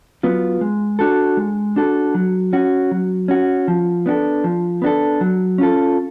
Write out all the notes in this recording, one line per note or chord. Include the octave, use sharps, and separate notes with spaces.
F#3 B3 F4
G#3
D4 F#4 A4
G#3
D4 F#4 A4
F#3
C#4 F#4
F#3
C#4 F#4
F3
B3 D4 F#4 A4
F3
B3 D4 F#4 A4
F#3
C#4 F4 A4